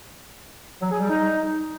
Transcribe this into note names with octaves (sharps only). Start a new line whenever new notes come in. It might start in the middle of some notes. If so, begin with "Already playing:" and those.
F#3
G#4
G3
D#4